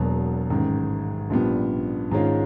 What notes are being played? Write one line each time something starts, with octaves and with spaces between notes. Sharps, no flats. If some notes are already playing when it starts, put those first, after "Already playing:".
Already playing: E1 E2 B2 F#3 A#3
A1 G#2 D#3
A#1 A#2 G3 B3
G#2 D#3 G#3 C#4 F4